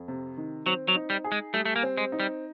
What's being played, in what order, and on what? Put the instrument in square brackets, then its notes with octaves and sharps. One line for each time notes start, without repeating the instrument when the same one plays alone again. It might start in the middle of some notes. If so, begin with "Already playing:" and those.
Already playing: [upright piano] F2
C3
D#3
[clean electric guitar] F#3 [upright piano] C4
[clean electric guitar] F#3
[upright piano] D#4
[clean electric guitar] G3
[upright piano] G#4
[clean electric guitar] G#3
[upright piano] G3 [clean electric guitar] A3
[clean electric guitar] A3
A#3
[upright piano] C4
[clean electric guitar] G#3
[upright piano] D#4
[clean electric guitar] G3